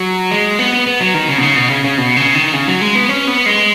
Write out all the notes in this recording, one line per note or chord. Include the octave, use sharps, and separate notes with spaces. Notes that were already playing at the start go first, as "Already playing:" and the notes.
Already playing: F#3
G#3
B3
B3
F#3
D#3
C#3
B2
C#3
B2
C#3
C#3
B2
C#3
D#3
C#3
F#3
G#3
B3
C#4
B3
G#3